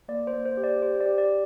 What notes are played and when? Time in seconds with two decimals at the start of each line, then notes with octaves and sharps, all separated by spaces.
0.08 A#3 D5
0.27 C5
0.33 A#3
0.45 C5
0.57 G4
0.64 D5
0.82 G4 C5
1.01 D5
1.06 G4
1.18 D5